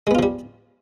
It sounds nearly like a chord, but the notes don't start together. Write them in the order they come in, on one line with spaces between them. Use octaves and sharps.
G#3 B3 F4 F3 G3